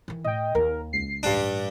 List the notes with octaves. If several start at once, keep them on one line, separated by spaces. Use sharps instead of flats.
D#3 E3
A2 D#5 G5
D#2 D#3 A#4
C#2 C7
A1 G2 D4